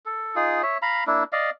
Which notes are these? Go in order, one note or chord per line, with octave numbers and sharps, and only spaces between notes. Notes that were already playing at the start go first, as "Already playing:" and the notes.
A4
D#4 F4 G#4
C#5 E5
F5 A#5 B5
A#3 D4 E4
D5 D#5 F5